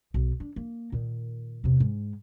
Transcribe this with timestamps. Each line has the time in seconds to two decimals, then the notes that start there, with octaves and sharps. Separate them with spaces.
0.14 B1
0.40 D4
0.56 A#3
0.92 A#2 D#3
1.64 E2 C3
1.80 G#2